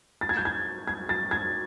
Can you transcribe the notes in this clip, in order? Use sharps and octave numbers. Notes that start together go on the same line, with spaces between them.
A6
G#6
G6
G#6
G#6
A6
G#6